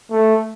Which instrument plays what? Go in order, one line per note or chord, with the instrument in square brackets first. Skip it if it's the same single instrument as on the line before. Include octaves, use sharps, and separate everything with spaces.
[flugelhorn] A3